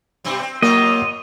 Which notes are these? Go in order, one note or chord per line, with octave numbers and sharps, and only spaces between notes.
G2 B2 C4
C4
C3 F#3 A#3 F4 D#5